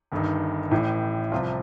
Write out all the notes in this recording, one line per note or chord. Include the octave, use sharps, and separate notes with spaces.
G1 G2 D#3
A1 A2 E3
C2 C3 F3 F4